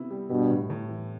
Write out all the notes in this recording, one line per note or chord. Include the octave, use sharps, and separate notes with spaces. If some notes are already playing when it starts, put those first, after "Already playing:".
Already playing: C3 B3 E4
G3
G2 B2 G3
A2
A2
E3